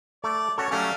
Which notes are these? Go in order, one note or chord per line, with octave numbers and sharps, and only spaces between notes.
A3 D5
C#4 F#4 A4 C#5
F#3 G3 A3 C#4 G4 F5